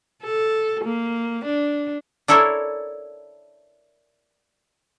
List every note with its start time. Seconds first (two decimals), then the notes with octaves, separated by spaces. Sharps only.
0.24 A4
0.84 A#3
1.45 D4
2.28 D4 E4 A4 A#4 C#5